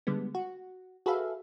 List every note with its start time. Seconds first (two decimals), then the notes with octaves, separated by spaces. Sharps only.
0.07 D3 G3 G#3 B3
0.35 F#4
1.06 F#4 G#4 A4 B4 E5 F5